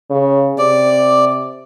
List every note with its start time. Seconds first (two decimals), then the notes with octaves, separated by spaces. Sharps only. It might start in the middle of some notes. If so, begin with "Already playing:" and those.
0.11 C#3
0.58 C3 D5